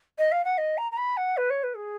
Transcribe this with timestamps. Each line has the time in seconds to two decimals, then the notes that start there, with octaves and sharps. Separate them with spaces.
0.18 D#5
0.31 F5
0.44 F#5
0.57 D#5
0.77 A#5
0.91 A#5
0.97 B5
1.17 F#5
1.37 B4
1.50 C#5
1.63 B4
1.76 G#4